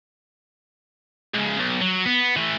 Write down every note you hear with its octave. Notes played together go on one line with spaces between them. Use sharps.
G#2 C#3
B1
F#3
B3
E3 A3